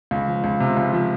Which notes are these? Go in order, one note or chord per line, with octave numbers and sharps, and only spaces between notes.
C#2
F3
C#2
C3
C#2
F3